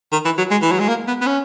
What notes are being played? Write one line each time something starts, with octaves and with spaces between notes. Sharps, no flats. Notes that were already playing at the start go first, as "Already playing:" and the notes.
D#3
E3
F#3
G#3
E3
F#3
G#3
A#3
B3
B3
C#4